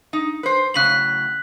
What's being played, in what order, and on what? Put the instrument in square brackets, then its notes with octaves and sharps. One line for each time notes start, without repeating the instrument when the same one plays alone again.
[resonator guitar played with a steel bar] D#4
B4 C5
[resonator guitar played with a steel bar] A2 C#3 F#3 [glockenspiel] F#6 B6 F#7